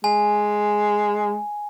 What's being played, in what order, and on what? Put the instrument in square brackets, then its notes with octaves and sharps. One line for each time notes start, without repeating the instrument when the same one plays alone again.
[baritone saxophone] G#3 [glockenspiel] G#5